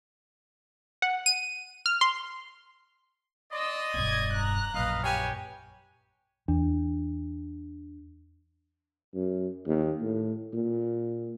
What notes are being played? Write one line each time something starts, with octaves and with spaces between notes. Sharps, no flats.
F#5
D#7
F6
C6
D5 D#5 C6 E6
E1 G2 G#6
A#5 F#6
A#1 F#2 B4 D#5 F5
G4 B4 C#5 G#5
E2 D4
F#2
D#2
A2
A#2